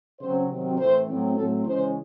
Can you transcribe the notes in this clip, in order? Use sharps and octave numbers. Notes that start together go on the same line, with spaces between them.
C#3 F#3 C4 C5
C3 D#3 F#3 C4
A2 E3 A3 C4 C5
A2 F#3 C4
A2 F#3 C4 A4
C#3 E3 G#3 C#4 C5